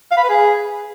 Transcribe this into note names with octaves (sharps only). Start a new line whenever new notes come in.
F5
B5
B4
G#4